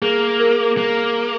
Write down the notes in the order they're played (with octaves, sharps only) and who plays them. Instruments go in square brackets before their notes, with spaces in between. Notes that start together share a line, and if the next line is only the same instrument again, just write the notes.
[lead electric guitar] A#3 [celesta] G#4
[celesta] A#4
[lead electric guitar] A#3